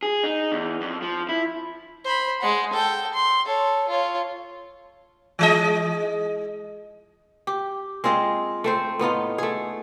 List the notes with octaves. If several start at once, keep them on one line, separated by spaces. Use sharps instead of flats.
G#4
D#4
E2
F2
F3
E4
C5 B5
G#3 F#5
A4 G5
C6
A4 C#5
F4 C#5
E3 G#3 D#5
G4
G#3 C4 F4 D#5
A3 C4 C5
A2 B3 D#4 F4
A3 G#4